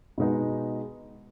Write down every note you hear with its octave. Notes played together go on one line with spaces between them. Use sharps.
B2 G#3 B3 D#4